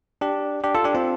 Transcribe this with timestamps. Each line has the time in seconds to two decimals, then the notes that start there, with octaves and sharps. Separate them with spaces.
0.21 D4 G4
0.64 D4 G4
0.75 F4 A4
0.84 D4 G4
0.95 C4 F4